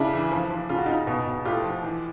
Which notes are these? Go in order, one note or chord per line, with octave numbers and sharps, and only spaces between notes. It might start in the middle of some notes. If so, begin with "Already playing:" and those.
Already playing: C#3 D4 E4
E3
F3
F3
C#3 F4
F#4
C#3 D#4 F4
B2
B2
A2 F4 G4
F3
E3